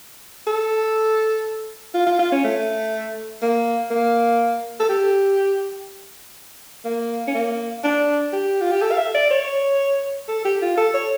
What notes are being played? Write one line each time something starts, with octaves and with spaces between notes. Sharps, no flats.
A4
F4
F4
F4
C#4
A3
A#3
A#3
A4
G4
A#3
C#4
A#3
D4
G4
F4
G4
A4
F5
E5
D5
C#5
A4
G4
F4
A4
C#5